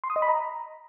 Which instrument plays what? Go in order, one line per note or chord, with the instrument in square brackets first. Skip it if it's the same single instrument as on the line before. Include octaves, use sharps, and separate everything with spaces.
[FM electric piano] C6
D#6
D#5
B5
A#5